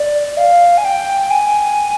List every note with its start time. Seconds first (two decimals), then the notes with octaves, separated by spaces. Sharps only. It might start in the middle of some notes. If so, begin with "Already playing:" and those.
Already playing: D5
0.37 F5
0.78 G#5
0.85 G5
1.31 G#5